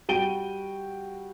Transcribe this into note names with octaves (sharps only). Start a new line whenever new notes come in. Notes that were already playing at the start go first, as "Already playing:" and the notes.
G3 F#4 G5 D7 D#7 G7